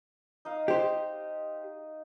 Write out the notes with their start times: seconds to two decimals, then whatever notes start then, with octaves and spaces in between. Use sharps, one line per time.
0.45 D#4 D#5 F5
0.68 G4 C5